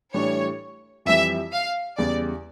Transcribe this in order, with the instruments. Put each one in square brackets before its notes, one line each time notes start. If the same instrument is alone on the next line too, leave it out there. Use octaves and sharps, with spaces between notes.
[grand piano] A2 E3 G3 D4 [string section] C#5
[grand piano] F2 E3 G3 [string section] E5
[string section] F5
[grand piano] E2 C#3 G3 [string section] D5